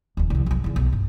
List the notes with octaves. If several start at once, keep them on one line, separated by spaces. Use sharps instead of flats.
D#1 D#2
C2 F2
B1 G2
E2 C#3
B1 A3
G2